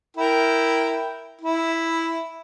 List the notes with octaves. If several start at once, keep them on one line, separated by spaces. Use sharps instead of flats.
E4 A#4 G5
E4